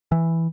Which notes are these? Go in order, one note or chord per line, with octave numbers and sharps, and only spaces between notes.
E3